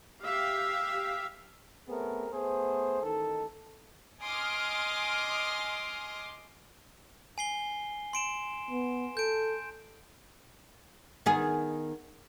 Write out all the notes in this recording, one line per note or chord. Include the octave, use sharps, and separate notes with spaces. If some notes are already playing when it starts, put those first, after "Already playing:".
G4 E5 F5
A3 B3 C4 G#4 A#4
A3 B3 G#4 C5
A1 D#3 D#4 A4
D#5 G#5 C6 D6 D#6 F6
G#5 C7 G7
C6 D7 E7
B3
A4 G6 D7
D#3 B3 G#4